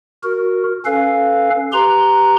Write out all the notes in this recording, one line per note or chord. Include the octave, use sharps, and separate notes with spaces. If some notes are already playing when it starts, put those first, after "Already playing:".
F#4 A#4
C#4 A4 B4 F5
G4 B4 A#5 C6